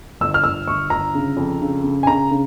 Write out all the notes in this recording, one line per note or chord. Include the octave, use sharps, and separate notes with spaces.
G1 E6
F6
G1 E6
G1 C#6
G1 A#5
C#3
F2
C#3
C#3
G#5
C#3 A#5
C#3